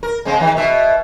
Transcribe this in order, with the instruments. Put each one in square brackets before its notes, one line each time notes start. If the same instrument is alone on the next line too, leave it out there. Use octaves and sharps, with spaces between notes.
[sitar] A#4
C#3 G#3 C4
D#3
B2 E5